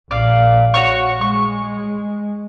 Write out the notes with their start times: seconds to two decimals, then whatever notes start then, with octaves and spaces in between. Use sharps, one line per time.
0.11 A#1 D5 F5
0.74 F#4 C#5 C#6
1.21 G#3 C#6